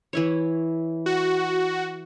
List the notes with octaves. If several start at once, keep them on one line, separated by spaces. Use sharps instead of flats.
E3 E4 C#5
F#4